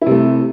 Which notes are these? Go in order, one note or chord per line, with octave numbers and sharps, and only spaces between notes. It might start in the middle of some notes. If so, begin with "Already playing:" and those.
C3 A3 E4